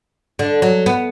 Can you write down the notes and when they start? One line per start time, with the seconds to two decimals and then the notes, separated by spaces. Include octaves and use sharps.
0.39 D3
0.62 F#3
0.86 B3